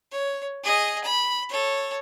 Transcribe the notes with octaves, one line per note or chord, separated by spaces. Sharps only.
C#5
G#4 D#5
B5
A4 C#5